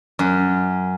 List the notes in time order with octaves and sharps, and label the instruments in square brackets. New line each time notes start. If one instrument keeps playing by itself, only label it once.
[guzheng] F#2